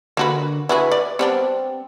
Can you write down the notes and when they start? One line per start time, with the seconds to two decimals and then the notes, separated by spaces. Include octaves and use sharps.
0.17 D3 A#3 F#4 B4
0.69 E4 F#4 G#4 B4
0.92 D5
1.19 G3 B3 C4 D4